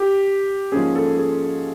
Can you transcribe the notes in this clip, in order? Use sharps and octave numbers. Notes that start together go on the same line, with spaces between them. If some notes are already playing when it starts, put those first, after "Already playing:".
Already playing: G4
G#2 F3 A#3 C#4 G#4
A4
G#4